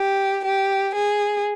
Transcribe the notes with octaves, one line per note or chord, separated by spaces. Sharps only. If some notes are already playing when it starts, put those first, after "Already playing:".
Already playing: G4
G4
G#4